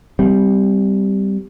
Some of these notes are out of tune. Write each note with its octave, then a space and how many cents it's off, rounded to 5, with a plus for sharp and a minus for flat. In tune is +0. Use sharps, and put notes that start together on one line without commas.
G3 +0 C4 -15